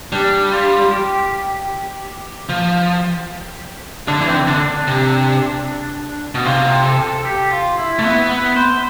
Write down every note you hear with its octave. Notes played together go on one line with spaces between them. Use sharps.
G3 D4
F4
G4
F3
D3 D4
E3
C4
D3
D3 D4
D4
C3
B2
C3 F4
A4
G4
F4
E4
A3
B3 E4
B4
C5